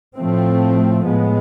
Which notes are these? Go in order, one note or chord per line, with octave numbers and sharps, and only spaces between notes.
A2 F3 A3 C4
A2 G#3 B3